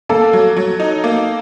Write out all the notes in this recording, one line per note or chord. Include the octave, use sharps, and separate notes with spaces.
A#3 A4
F#3
F#3
D#4
A#3